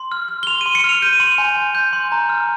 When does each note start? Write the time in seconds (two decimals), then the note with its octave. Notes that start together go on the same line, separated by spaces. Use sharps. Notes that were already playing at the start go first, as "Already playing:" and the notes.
Already playing: C6
0.12 F6
0.29 F6
0.43 G7
0.47 C6 F7
0.61 D#7
0.66 C6
0.75 C#7
0.84 F6 F7
1.02 G6 D#7
1.20 C6
1.38 G#5
1.56 G#5
1.75 G6
1.93 C6
2.12 A#5
2.29 F6